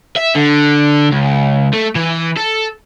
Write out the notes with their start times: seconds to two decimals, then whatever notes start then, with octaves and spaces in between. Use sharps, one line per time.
0.16 E5
0.35 D3
1.12 C#2
1.74 A3
1.96 E3
2.37 A4